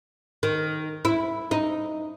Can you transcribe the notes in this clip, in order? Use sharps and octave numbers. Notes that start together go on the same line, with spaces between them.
D#3
E4
D#4